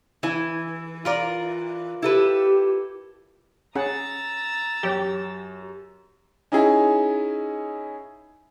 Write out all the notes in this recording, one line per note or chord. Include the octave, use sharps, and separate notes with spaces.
E3 E4 G#5
F4 A#4 D5
E4 G4 A4 B4
C#4 G#4 F#5 A#5 E6 A6
F#2 G4 C#5
C#4 D#4 E4 G#4